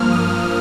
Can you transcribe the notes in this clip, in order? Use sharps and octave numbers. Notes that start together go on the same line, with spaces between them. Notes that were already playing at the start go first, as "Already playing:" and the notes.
Already playing: G2 F3 A#3 F6
D#6